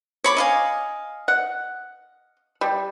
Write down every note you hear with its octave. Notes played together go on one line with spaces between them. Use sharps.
C#5 B5 D6
D#5 F5 G#5
F#5
G3